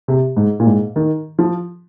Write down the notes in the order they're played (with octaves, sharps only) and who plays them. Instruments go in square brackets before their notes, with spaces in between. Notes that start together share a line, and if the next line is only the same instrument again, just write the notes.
[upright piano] C3
G#2
A#2
G#2
D#3
F3